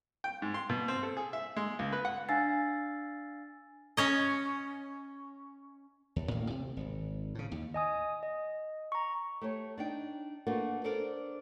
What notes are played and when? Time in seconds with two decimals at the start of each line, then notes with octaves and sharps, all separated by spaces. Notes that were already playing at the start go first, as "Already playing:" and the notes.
0.24 G5
0.42 G#2
0.54 C6
0.70 B2
0.88 C4
1.03 A4
1.17 G#4
1.33 E5
1.57 G#3
1.79 C#2
1.92 B4
2.05 F#5
2.28 D4 F5 G#5 E6 A6 C7
3.97 C#4 C#5 D#5
6.16 D#2
6.31 A1 A2 A#3
6.50 C3
6.77 G#1
7.35 A2 C#3
7.52 D#2
7.74 D#5 G#5 D#6
8.23 D#5
8.92 A#5 C#6
9.41 A3 G4 C#5
9.78 D4 D#4 G5
10.47 A3 A#3 D4 F#4 A#4 B4
10.84 D4 A4 A#4 C5 D5